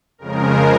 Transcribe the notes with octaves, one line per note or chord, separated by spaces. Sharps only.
F2 C#3 F3 G#3 A#4